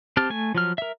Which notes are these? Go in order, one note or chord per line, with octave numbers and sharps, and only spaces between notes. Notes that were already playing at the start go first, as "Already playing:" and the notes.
C4 G4 A5 F6
A3 G#5
F3 F#3 F6
A#4 E5